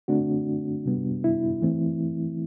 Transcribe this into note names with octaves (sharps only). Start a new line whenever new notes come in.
D3 A3 C4 D4 F#4
C3 G3 B3
E4
E3 A3 C4